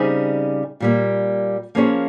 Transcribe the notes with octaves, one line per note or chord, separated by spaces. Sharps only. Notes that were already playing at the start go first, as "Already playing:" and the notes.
Already playing: C#3 G3 C4 D#4 G#4
A#2 G3 A#3
F3 A#3 C#4 G#4 C#5